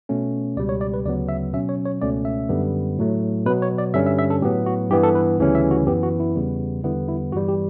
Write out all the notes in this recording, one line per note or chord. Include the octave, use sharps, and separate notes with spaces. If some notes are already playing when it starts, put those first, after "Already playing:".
B2 A3 C#4
C#2 B2 G3 D5
C#5
D5
B4
D2 C#3 F#3 B3 D5
E5
B2 F#3 C#4 E5
C#5
C#5
C#2 B2 A3 C#4 D5
E5
F#2 D3 G3 B3
A2 F#3 A3
B2 F#3 B3 B4
C#5
D5
G2 D3 G3 C#4 E5
E5
E5
A4
A2 F#3 B3 G4
F#4
G2 E3 B3 G4
A4
B4
D2 C#3 E3 G3 C#4
E5
F#4
F#2 E3 B3 G4
F#4
E4
E2 C#3 G3 B3
E2 D3 G3 B3 E4
E4
G2 E3 G3 F#4
G4